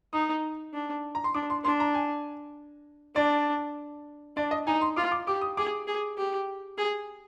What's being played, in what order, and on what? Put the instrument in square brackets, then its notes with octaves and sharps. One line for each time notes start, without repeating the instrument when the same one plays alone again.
[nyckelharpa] D#4 [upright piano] D#6
[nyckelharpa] D4
[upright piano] A#5
C6
[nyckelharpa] D4 [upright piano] D6
[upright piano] C6
[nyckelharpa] D4 [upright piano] C6
[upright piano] A#5
G#5
[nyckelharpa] D4 [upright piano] D5
[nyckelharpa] D4 [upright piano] D5
[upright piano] D#5
[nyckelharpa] D#4 [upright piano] G#5
[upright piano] C6
[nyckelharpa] F4 [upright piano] D6
[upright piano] D6
[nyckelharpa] G4 [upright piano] D6
[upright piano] D#6
[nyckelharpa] G#4 [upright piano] D6
[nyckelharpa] G#4
G4
G#4